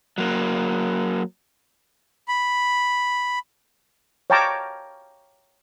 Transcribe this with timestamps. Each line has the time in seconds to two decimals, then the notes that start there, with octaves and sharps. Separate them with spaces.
0.18 F#3 A#3
2.28 B5
4.30 C#5 F5 G5 A5 A#5 D6